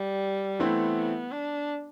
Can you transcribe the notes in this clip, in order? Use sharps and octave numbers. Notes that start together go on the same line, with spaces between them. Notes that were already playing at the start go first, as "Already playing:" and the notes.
Already playing: G3
E3 A3 B3 C4 E4
D4